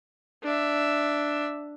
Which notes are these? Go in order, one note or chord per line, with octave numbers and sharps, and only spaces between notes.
D4 E5